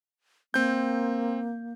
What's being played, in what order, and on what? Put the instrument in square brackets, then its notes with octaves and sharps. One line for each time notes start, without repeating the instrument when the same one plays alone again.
[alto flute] A#3 [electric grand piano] C4 G6